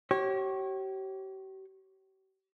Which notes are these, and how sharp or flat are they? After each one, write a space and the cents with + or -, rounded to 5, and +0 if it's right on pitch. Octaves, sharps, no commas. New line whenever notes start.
G4 -40 C#5 -25